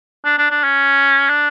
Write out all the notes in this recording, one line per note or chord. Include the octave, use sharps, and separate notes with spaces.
D4
D4
D4
C#4
D4